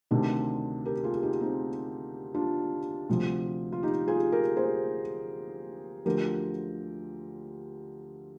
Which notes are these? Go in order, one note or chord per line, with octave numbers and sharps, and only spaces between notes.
D2 C3 D#3 D4
G4 A#4
F4 G#4
D#4 G4
C4 D#4
D4 F4
D2 C3 F3
F4
D#4 G4
F4 G#4
G4 A#4
G#4 C5
D2 D3 F3 G4 A#4